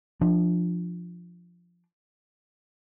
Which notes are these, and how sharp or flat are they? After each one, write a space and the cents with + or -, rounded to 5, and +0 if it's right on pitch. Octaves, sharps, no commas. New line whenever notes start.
F3 +0 D4 +20